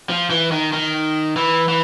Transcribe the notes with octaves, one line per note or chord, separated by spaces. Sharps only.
F3
E3
D#3
D#3
E3
E3